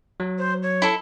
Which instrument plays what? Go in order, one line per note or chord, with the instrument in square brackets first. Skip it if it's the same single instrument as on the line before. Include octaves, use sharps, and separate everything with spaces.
[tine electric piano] F#3
[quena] C5
C#5
[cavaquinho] E4 A4